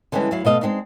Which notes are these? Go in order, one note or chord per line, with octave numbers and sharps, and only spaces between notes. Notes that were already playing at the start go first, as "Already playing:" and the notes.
D3 E3 G3 G#3 C#4
D2 F#3 E4 F5
B2 A3 D#5 F5
G#3 A#3 C4 D4 D#4